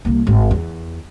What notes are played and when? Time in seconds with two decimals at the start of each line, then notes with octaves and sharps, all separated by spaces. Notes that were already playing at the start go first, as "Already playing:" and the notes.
0.05 C2 A#3
0.27 G#1 C4
0.51 E2